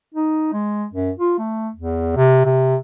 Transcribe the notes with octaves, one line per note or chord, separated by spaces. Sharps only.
D#4
G#3
F#2
F4
A3
E2
C3
C3